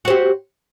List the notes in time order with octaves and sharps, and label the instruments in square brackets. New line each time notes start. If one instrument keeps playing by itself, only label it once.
[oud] F#4
C5
G4